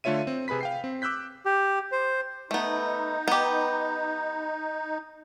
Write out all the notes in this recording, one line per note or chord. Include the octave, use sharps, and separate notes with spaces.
D3 A3 F4 C#5 E5 D#7
C4
C3 G#4 B4 B5 B6
F5 G5 C7
C4
D6 E6 F#6 G6 B6
G4
C5
A3 B3 D#4
B3 G4